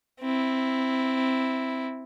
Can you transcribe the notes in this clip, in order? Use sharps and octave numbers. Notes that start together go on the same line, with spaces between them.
C4 E4